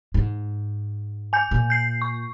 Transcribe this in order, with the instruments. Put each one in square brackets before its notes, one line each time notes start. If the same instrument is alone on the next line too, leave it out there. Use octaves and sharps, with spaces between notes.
[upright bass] G#2
[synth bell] G#5 G6
[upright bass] A#2
[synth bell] G6 C7
C#6